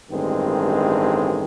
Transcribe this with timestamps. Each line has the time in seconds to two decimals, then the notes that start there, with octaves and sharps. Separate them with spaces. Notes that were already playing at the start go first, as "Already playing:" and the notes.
0.11 A1 G2 D#3 G#3 C4